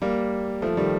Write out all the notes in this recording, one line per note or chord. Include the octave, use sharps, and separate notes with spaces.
G3 A#3
F3 A3
D#3 G3